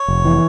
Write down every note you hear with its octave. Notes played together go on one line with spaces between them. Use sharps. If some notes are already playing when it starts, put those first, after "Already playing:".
Already playing: C#5
F1
E3